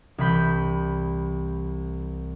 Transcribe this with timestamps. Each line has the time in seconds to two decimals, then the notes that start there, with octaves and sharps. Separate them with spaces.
0.18 C2 E3 B5 G6